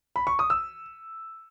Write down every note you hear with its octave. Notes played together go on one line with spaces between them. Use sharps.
B5
C#6
D#6
E6